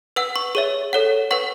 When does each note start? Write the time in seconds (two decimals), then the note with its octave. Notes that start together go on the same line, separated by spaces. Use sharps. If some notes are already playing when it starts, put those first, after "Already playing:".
0.16 B4 F#5 E6
0.36 C#6
0.55 G#4 C#5 E5 C#6
0.93 A4 C#5 F#5
1.31 B4 F#5 C#6